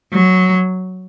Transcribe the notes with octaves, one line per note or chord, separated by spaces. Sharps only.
F#3